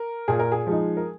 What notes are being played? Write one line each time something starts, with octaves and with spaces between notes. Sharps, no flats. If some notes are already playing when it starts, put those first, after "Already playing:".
Already playing: A#4
A#2 G#4
A#4
G#4
F3 G#3 D#4
A#4